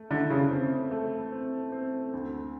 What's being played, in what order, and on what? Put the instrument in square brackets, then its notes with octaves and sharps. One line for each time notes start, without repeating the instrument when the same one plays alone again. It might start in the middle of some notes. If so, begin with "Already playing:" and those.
Already playing: [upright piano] A3
[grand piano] D3 [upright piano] E4
[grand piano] C#3
[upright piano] C4
A3
C4
C4
D2